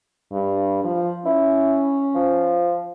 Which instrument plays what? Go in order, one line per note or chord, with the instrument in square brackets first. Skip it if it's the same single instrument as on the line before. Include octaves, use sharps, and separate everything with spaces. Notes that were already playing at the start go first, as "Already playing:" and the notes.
[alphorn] G2
F3
[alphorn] C#4 [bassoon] E4
[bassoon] F3